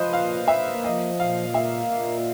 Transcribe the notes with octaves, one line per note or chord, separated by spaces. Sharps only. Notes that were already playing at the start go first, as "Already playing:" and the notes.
Already playing: F3 B4 C5 D#5
A#2 F5
A#3 E5
F3 D#5
A#2 F5
A#3 E5
A#2